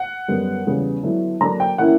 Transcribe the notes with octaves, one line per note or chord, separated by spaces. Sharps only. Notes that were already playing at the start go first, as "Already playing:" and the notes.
Already playing: F#5
F#2 D3 G3 B3
E2 C#3 G3 B3
D3 F#3 B3 E4
D3 F#3 A#3 D4 A#5
G5
E3 A#3 C#4 E4 F#5